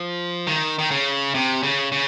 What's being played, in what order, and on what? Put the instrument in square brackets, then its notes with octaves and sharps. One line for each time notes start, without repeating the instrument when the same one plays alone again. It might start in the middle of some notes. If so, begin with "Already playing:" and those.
Already playing: [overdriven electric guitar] F3
D#3
D#3
C#3
C3
C#3
C#3